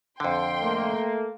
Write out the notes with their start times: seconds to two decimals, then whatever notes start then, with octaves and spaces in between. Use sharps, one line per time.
0.20 F2 D3 G5 C6
0.62 A3 A#3